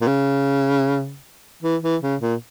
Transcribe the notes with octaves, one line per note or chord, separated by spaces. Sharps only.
A#2
C#3
E3
E3
C#3
A#2